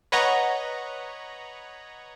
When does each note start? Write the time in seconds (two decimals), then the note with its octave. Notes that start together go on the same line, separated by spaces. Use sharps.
0.12 B4 C#5 D#5 F#5 A#5